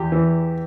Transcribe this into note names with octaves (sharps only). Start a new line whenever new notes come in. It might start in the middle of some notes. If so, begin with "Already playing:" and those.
Already playing: E2 G4
E3